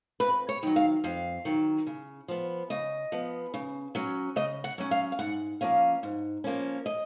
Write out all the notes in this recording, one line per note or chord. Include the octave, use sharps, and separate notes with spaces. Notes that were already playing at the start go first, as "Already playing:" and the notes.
F2 B4
C#5
D#3 F#3
F5
F2 F5
D#3 F#3
C#3
F3 B3
C#3 D#5
F3 B3
C#3
F#3 C#4
C#3 D#5
F#5
F#3 C#4
F5
F5
G#2 F#5
F3 A#3 C#4 F5
G#2
F3 A#3 C#4
D#5